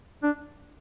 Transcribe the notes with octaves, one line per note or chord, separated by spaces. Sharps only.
D4